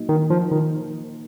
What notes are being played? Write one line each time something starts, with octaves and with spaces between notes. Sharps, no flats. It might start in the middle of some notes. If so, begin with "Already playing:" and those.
Already playing: A#2 F#3 A#3 D#4 A#4
D#3
F3
D#3